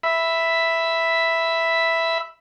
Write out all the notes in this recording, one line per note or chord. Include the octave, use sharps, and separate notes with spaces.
E5 B5